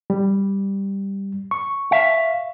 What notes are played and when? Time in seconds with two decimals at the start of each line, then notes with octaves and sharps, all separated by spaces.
0.10 G3
1.51 C#6
1.91 E5 F5